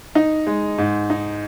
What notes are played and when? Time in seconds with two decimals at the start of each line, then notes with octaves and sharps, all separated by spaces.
0.15 D#4
0.47 G#3
0.78 G#2
1.10 D#4